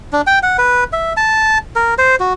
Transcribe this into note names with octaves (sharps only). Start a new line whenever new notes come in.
D4
G5
F#5
B4
E5
A5
A#4
C5
F#4